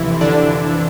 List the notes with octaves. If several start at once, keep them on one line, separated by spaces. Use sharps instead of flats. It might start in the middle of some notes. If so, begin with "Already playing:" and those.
Already playing: F2 C3 E3 E4
D3 D4